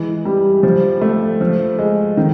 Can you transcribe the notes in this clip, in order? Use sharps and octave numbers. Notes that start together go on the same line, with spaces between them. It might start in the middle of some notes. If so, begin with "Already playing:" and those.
Already playing: E3 G#3
G3
F3
A3
F3
G#3
D#3